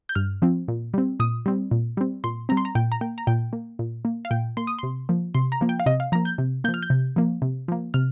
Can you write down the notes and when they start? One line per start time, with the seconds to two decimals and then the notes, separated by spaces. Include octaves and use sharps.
0.09 G6
0.15 G2 F6
0.42 F3 C4
0.68 A#2
0.94 G3 C4
1.20 A#2 D#6
1.46 G3 C4
1.71 A#2
1.97 G3 C4
2.24 A#2 C6
2.49 G3 C4 A#5
2.57 C6
2.65 A#5
2.75 A#2 G5
2.92 A#5
3.01 A#3 G5
3.18 A#5
3.27 A#2 G5
3.53 A#3
3.79 A#2
4.05 A#3
4.25 F5
4.31 A#2 G5
4.57 A#3 C6
4.67 D#6
4.79 C3 C6
5.09 F3 A#3
5.34 C3 C6
5.52 A#5
5.61 F3 A#3
5.69 G5
5.80 F5
5.86 C3 D#5
6.00 F5
6.12 F3 A#3 A#5
6.25 G6
6.38 C3
6.64 F3 A#3 G6
6.74 F6
6.83 G6
6.90 C3
7.16 F3 A#3
7.42 C3
7.68 F3 A#3
7.94 C3 F6